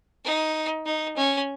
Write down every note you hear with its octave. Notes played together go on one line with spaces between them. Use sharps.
D#4
D#4
C#4